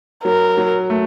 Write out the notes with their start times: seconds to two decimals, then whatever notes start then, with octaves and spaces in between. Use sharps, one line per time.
0.24 F#3 A#4
0.57 F#3
0.90 A3